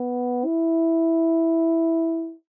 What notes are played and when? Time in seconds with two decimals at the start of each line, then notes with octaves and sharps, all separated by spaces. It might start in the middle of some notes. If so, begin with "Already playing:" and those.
Already playing: B3
0.46 E4